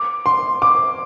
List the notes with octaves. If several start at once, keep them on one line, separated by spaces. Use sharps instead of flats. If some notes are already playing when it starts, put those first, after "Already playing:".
Already playing: D6
C6
D6